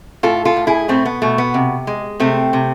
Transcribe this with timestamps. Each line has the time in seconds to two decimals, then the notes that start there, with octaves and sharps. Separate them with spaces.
0.23 A2 F4 A4
0.45 F4 A4
0.56 A2
0.67 E4 G#4
0.88 B2 A3 C4
1.05 B3
1.22 B2 A3
1.38 B3
1.54 C3
1.87 G#3
2.20 C3 A3 C4
2.53 C3